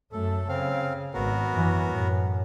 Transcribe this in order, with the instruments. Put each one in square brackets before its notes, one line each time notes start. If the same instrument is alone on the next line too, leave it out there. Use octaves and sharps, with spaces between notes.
[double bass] F#2 A3 [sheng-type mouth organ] A4
[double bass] C#3 [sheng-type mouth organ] C4 F5
[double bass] G#1 [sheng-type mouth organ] B3 F#4 A#4
[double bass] F#2 E3
F#2 A2